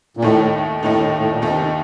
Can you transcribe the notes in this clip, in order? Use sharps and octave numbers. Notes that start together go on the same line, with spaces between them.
A#2
D#2 A2 D#3 A3 D#4
D#2 A2 D#3 A3 D#4
A2
A#2
D#2 C3 D#3 A3 D#4